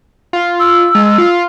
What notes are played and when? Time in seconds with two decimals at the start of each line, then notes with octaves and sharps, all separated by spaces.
0.33 F4
0.60 E6
0.95 G#3
1.18 F4